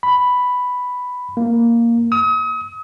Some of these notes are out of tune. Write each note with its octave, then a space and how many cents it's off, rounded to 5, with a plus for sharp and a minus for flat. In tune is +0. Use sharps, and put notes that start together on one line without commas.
B5 +5
A#3 +0
D#6 +40